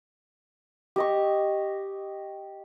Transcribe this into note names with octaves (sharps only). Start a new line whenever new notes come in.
G4 D#5 C#6